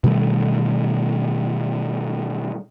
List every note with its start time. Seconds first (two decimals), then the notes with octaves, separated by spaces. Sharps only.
0.04 B2 D#3 G3 A3